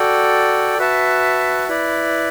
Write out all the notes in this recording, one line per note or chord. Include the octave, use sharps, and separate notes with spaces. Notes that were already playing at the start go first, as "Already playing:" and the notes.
Already playing: F#4 A4 D5 G5
F#4 B4 E5 A5
E4 B4 D5